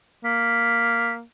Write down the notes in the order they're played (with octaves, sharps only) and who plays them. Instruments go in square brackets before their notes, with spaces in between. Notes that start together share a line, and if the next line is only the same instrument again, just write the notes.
[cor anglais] A#3 [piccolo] B6